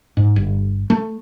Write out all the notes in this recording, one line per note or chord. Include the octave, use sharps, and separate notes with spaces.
G#2
G1
A3